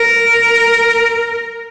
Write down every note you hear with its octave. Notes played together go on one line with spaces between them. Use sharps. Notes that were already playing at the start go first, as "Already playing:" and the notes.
Already playing: A#4